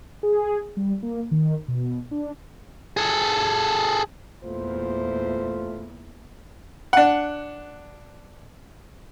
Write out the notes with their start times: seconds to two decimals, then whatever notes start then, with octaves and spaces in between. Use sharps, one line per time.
0.23 G#4
0.77 G3
1.03 A#3
1.31 D#3
1.68 B2
2.11 D4
2.97 G#4 A4
4.44 E2 A#2 A3 F4 C5
6.93 D4 F#5